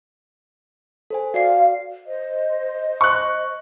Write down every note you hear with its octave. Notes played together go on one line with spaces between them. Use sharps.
A4 C5 G#5
F#4 D5 F5 C7
C5 D#5
C#6 F#6